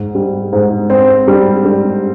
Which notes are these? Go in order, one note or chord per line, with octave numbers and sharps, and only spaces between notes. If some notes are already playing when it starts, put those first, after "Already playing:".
Already playing: G#2
G3
G#2
C4
G3
G3